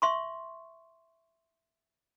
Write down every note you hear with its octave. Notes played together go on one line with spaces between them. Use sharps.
E5 C6 C#6